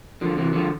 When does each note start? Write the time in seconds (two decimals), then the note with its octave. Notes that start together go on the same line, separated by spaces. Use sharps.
0.21 D3 F3
0.37 C3 E3
0.53 D3 F3